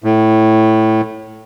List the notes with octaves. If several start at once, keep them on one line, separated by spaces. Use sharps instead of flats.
A2